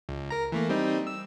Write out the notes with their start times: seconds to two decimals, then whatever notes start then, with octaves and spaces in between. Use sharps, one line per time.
0.09 C#2
0.30 A#4 A#5
0.52 E3 A3 A#3
0.69 G3 C4 D#4
1.07 E6